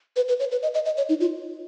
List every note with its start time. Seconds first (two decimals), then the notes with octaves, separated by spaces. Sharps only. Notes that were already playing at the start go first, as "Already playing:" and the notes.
0.16 B4
0.28 B4
0.40 C#5
0.51 B4
0.63 D#5
0.74 D#5
0.86 D#5
0.97 C#5
1.09 D#4
1.20 F4